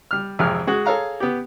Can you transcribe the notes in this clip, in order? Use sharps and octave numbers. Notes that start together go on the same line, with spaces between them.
G3 F6
G#1 F2 C3 G#4 F6
G#3 F#4 G#4
G#4 A4 C#5 F5 A#5
B3 G4